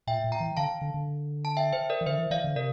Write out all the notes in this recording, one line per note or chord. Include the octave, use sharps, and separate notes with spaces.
A#2 E5 G5
A#2
G5 A#5
E3
D3 F5 A5
D3
D3
A5
E5 G5
C5 E5
A#4 D5
E3
D3 C5 E5
E3
E3 D5 F5
D3
C3 A#4 D5